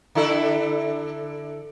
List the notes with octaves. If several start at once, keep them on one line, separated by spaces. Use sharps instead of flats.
D3 E4 A4